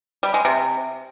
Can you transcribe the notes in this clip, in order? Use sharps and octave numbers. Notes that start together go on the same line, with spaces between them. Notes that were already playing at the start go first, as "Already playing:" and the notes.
G3
G#3
C3